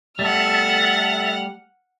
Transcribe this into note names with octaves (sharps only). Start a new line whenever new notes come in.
G3 A3 A4 E5 F#5 A5 F6